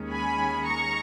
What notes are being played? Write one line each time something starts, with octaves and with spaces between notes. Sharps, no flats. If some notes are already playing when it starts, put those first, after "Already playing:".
Already playing: D#2 D#3 G#3 C#4
G#5 B5
A#5 C#6